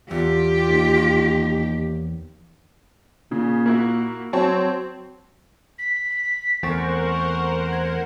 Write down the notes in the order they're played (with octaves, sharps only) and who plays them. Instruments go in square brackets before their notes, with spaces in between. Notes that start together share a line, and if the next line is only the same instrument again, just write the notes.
[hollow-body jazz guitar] E2 [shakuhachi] F4 [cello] G4
[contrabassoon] D#2
[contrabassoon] A#2 [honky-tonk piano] C#3
[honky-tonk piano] A#3 E4 F#4
[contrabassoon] F#3 [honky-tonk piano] C4 C#5 A5
[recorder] B6
[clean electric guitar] E2 A3 C4 [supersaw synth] A#4 C5 F#5 [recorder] C#6
[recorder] G#6